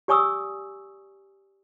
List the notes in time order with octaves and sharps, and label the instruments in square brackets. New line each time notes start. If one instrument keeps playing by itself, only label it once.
[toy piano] G4 D5 G#5 C#6 D#6 E6